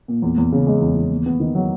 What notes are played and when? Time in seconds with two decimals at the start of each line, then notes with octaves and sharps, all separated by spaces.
0.08 A#2
0.22 E2
0.38 E2
0.52 C#3
0.67 G#3
0.81 E2
0.95 E2
1.11 D#2
1.26 B3
1.40 D#3
1.55 F#3